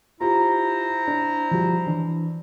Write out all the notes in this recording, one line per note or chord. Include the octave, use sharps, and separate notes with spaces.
E4 F4 G4 C5 A#5
D4
F3 G3 F#4
E3 D4